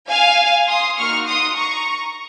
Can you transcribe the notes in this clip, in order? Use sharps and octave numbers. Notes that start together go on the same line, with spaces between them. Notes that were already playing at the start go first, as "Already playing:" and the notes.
F5 G#5
C6 D#6
A#3 D#4 F#4 C#6 F6
C6 D#6
A#5 C#6